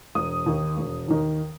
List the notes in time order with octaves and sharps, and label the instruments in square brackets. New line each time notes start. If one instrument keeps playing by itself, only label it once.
[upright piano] E1 D#6
D#2 D#3
E1
D#2 D#3